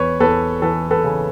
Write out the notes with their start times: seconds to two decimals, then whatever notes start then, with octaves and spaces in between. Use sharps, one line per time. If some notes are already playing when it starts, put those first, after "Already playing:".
Already playing: E2 B4 C#5
0.20 E2 A4 B4
0.62 E3 A4 B4
0.91 A4 B4
1.04 C#3